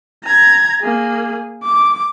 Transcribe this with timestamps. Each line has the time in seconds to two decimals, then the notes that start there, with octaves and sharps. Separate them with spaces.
0.24 A#5 G#6
0.81 A#3 G#4
1.63 D6